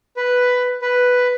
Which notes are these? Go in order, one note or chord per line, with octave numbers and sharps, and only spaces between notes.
B4
B4